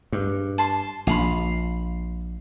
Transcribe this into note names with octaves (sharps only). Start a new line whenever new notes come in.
G2
A5 C6
A#1 F5 B5 C6